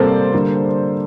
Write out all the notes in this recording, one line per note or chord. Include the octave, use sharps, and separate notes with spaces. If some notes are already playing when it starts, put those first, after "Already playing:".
Already playing: C3 G3 A#3 A4 C5 D5
D3 G3 A#3